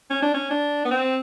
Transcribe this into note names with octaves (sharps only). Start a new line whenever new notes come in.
C#4
D4
C#4
D4
B3
C4